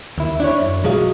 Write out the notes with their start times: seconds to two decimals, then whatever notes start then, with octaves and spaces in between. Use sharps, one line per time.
0.18 D#2 E4
0.40 D4 E4 C#5
0.60 F#2
0.84 B1 F3 F#3 G#3 G#4 F5